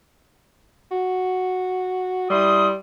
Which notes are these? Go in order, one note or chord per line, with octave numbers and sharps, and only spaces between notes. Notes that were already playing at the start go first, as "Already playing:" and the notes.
F#4
G3 E4 C6 D#6